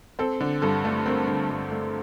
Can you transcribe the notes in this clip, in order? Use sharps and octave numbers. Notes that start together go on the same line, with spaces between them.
C4 A4
D3
G2 A4
A3
C4 A#4
D3
G2
A3